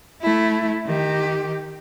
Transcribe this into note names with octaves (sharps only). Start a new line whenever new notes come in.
A3 E4
D#3 G4